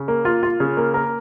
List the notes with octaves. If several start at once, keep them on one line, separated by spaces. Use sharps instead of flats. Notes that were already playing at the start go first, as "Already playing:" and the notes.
Already playing: C#3
A#3
F4
F4
C#3
A#3
A#4